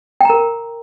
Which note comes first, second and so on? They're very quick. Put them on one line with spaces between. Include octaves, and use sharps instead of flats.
G5 A#5 A#4